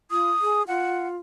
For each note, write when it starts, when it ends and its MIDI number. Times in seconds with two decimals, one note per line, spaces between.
0.11 0.30 65
0.11 0.63 87
0.41 0.66 68
0.68 1.17 65
0.68 1.08 78